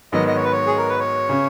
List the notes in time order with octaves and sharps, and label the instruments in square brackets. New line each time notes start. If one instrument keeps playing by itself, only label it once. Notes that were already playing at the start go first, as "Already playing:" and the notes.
[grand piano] G#2 D#3 F#3 B3 [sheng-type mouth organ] D#5
[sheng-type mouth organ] D#5
C#5
B4
C#5
G#4
A#4
B4
C#5
[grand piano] C#3